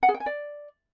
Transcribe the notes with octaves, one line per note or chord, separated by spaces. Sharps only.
F#5
G#4
G5
G#5
D5